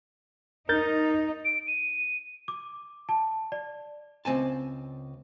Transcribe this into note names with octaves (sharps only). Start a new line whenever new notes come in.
D#4 A#4 G6 A6
D7
D#7
D6
A5
D5
C#2 C4 G#5 A5